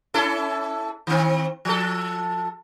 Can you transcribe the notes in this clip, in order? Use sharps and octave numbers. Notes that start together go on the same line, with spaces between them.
C#4 E4 A4
D#3 C4
F3 A4